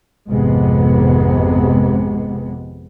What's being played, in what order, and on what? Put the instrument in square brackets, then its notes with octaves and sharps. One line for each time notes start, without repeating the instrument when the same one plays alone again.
[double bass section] G#1 F2 C3 G#3 B3